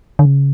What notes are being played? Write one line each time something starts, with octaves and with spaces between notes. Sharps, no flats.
D3
C#3